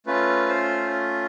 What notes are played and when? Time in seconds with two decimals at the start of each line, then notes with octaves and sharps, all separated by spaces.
0.06 A3 C#4 F4 B4
0.49 C5